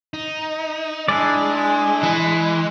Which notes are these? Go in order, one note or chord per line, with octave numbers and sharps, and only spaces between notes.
D#4
G#3 D4 E4 D5 G#5
E3